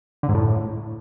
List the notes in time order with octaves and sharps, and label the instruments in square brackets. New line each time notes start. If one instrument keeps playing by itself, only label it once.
[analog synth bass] D3
G#2
A2